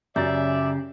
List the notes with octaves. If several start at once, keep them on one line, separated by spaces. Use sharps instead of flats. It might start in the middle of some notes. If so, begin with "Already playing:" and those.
F#2 C#3 C#4 G4 D5 E5 G6 A6